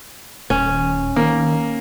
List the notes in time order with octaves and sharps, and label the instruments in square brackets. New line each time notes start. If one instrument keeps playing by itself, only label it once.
[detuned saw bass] D#1 [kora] C#4
[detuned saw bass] D#3 [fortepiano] A#3